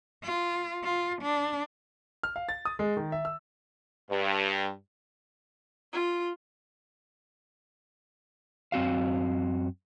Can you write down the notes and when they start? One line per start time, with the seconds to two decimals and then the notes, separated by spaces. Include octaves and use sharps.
0.23 F4
0.84 F4
1.22 D4
2.23 F6
2.36 F5
2.49 A6
2.65 D#6
2.79 G#3
2.97 D#3
3.12 E5
3.25 E6
4.11 G2
5.93 F4
8.72 F#2 C4 F#4 F5